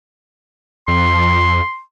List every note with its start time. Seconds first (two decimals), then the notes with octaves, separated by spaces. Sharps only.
0.88 F2 C6